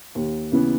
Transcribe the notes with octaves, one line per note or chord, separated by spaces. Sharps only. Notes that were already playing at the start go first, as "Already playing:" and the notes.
D#2
C#3 E3 B3